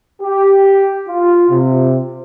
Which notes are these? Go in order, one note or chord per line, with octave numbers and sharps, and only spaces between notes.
G4
F4
C3